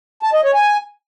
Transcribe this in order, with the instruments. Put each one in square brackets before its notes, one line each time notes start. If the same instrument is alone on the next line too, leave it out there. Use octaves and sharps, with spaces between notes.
[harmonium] A5
D#5
C#5
G#5